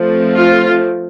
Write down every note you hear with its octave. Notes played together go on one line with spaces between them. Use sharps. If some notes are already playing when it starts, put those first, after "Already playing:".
Already playing: F3 A3 C4
F4